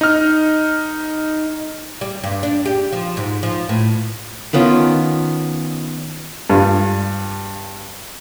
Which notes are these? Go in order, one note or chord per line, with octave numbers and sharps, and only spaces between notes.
D#4 F6
G3
G2
D4
G4
F3
G#2
F3
A2
D#3 B3 C#4 F4
G2 F4